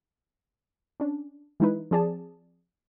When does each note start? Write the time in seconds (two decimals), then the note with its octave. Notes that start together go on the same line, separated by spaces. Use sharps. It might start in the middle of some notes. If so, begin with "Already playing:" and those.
1.00 C#4 D4
1.60 E3 G#3 D#4 E4 B4
1.91 F3 C4 G#4 D5 A5